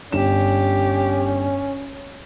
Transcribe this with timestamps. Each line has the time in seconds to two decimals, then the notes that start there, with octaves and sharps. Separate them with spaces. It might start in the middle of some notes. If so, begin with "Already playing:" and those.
0.12 G1 C#4 G4 E7